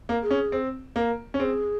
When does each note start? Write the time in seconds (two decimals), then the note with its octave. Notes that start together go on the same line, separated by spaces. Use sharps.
0.09 A#3
0.23 G#4
0.31 C#4
0.52 C4
0.96 A#3
1.34 C#4
1.39 C4 G#4